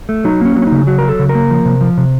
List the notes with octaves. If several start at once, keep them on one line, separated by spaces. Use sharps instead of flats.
A3
F#3 D#4
A#3 C#4
F#3
C#4
D#4
C#3
F#3 F#4
F#3 A#4
A4
C#3
A#4
A#3
F3
C3
F3
C3